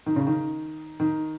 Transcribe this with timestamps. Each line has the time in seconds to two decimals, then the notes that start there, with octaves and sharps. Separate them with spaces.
0.06 D#3
0.16 C#3
0.27 D#3
1.00 D#3